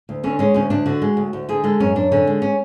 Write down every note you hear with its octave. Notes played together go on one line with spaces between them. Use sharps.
D2
D3 C#4
G#3 C#4
D2 C#4
D2 D4
D3 F#4
G#3
D2
D2
D3 G#4
G#3 A4
F#2 C#4
F#2 D4
D3 C#4
G#3
C#4